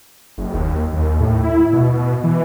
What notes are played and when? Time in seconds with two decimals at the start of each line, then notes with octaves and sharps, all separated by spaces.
0.38 F#1
0.54 D#2
0.93 D#2
1.20 A2
1.44 E4
1.73 B2
1.93 B2
2.23 E3